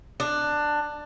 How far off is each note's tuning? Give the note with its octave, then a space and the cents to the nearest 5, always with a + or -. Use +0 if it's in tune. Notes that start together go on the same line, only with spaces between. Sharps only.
D4 +15